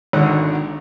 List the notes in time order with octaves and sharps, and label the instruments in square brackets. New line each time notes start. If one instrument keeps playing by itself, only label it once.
[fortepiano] G#1 D3 D#3 F#5